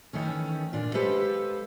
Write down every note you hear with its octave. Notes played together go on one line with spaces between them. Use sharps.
D#3 E3 A3 C#4
A#2 D4 F4
G#3 G4 A4 B4 C5 F5